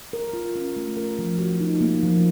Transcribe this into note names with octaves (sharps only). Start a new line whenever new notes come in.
A#4
F4
C#4
A3
A#4
F3
F#4
D#4
A#3
F3